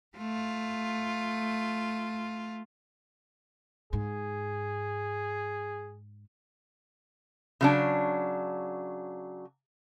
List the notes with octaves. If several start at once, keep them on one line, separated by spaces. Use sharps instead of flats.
A3 F4
G#2 G#4
C#3 F#3 D4